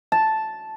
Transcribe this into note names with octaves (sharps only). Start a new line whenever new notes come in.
A5